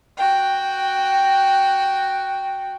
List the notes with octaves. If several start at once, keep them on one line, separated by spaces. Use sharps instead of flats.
F#4 G5